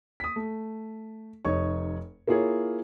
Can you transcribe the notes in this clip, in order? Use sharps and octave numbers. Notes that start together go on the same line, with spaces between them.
D#6 B6
A3
F1 D#4 C#5 C#6
A#3 E4 F4 G#4 A#4 C#5